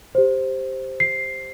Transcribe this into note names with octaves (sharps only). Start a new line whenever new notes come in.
G4 C5
C7